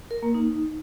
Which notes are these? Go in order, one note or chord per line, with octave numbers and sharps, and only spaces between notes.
A#4
A#3
D#4